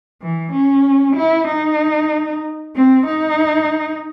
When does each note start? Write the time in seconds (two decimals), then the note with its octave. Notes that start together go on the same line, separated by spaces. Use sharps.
0.21 E3
0.52 C#4
1.16 E4
1.48 D#4
2.74 C4
3.06 D#4